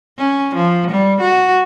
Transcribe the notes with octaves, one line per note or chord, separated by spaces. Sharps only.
C#4
F3
G3
F#4